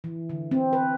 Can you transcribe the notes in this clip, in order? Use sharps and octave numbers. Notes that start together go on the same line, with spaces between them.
E3
D3
C4
B4